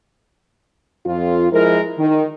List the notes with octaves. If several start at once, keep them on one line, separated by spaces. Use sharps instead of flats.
F2 F4
F3 G#3 E4 A#4
D#3